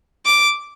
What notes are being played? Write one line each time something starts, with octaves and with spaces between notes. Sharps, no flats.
D6